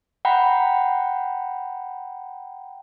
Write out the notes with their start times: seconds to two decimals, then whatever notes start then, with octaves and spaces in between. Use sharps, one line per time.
0.25 F#5 G5 A#5 B5